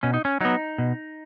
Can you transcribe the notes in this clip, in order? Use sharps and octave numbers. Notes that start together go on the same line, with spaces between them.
B2 C#4
D#4
C#4
F#3 B3 D#4
B2